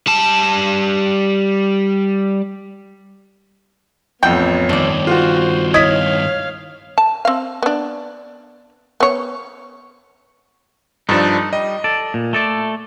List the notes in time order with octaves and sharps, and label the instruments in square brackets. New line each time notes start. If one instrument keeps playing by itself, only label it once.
[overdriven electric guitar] G3 A5
[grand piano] A1 F2 [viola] B3 C#5 [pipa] F#5 G5
[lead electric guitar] G2 D#3 [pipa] D4 D5
[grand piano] F4 F#4 [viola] C5
[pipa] E4 D#5 [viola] C#5 F5 [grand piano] G#6 B6
[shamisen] A5
C4 F5
B3 D4
B3 C#5
[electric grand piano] G2 F3 D4 [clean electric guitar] D#4 A4
[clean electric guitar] G3 [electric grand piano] D#5
[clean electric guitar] A4 D5
A#2
A3 A4 D5